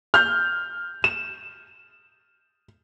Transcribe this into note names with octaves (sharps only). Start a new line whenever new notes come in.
F6 G6
E7